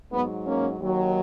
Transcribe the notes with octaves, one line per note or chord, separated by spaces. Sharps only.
G#2 F#3 B3
A#3 C#4
D#2 D#3 F#3